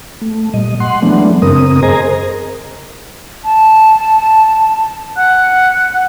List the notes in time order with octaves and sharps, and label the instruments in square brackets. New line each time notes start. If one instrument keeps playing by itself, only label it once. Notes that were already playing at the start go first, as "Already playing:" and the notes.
[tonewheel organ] A3
A#2 G3 D#5
F#5 C6
E3 F#3 G#3 A3 B3 D4
F#2 C#3 C4 A#4 D#6
G#4 A#4 C5 D#5 G#5 A#5
[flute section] A5
F#5 F#6